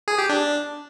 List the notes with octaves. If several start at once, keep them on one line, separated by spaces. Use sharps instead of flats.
G#4
G4
D4